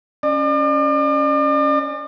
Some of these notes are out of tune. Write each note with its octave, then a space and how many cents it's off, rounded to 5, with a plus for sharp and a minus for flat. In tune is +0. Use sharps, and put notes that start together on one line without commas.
C#4 +0 D5 +40